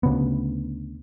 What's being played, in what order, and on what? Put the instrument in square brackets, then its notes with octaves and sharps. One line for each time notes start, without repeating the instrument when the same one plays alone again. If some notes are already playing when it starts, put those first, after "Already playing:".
[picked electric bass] D2 C#3 B3